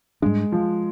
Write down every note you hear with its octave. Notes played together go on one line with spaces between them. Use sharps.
G#2 G3 G#3 D4
F3